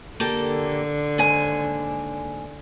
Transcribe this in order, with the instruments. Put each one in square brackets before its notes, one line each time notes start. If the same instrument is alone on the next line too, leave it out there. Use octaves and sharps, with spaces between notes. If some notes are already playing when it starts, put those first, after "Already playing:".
[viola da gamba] D3 [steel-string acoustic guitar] A#3 G4 A4
[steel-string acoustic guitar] D#2 G#2 G#5